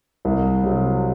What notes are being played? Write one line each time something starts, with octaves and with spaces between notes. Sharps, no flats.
C2
C3 F#3